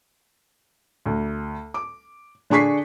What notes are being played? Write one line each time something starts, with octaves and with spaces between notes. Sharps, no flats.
D2
D6
D3 D4 G#4 C#6 B6 C7